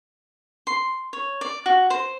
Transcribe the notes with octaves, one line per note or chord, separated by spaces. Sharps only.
C6
C#5
D5
F#4
C5